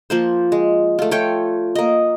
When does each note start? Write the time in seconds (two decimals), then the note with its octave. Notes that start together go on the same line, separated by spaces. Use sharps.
0.10 F3 A#3 C5
0.52 G#3
0.99 A3 F4
1.11 A3 F4 C#5 G5
1.75 A#3 D#5